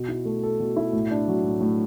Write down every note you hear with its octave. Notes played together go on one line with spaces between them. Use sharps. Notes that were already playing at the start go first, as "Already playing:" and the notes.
Already playing: B2
E4
A3
A4
B2
E4
A2
D4
F#3
A2
A2